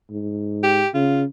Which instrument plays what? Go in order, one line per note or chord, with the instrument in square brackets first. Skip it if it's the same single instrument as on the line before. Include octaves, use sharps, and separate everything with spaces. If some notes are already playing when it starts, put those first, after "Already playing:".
[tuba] G#2
[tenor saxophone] G4
[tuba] C#3 [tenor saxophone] F4